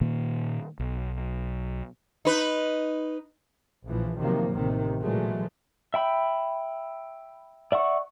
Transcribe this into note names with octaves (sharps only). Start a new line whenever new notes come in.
A#2 D#3 A#3
B1
D#4 B4
A#1 E3 F3
C3 D#3 F3 F#3 A#3
A1 A2 C3 D#3
A#2 E3 F#3 G#3 A3
E5 G5 B5
D5 E5 F#5 C#6